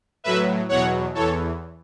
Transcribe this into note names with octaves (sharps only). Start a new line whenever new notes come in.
A2 F#3 B4 E5
E2 B2 F#3 C#5 F#5
E2 E3 A4 C#5